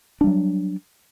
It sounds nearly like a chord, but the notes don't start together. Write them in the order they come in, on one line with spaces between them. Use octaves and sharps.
D4 G3 F#3